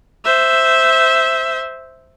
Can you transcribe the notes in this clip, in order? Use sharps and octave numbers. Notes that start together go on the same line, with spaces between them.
C5 E5